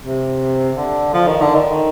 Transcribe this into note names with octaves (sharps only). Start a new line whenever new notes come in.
C3
D3
F3
D#3
D3
D#3